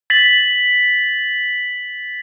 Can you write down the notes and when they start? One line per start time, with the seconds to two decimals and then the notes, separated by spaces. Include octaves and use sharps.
0.10 A6 B6 F#7